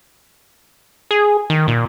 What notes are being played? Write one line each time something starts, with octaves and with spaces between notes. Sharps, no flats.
G#4
D#3
A#2